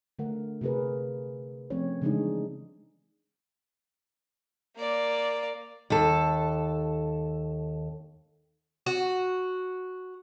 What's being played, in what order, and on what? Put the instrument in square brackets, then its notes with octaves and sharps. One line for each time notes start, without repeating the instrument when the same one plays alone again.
[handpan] D3 A3 A#4 F#5
C3 A#3 G#4 A#4 B4
F3 A3 C4 C#4 C#5
C#3 E3 G#3 D4 D#4 G#4
[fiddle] A#3 D5
[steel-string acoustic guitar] D#2 A4
[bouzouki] F#4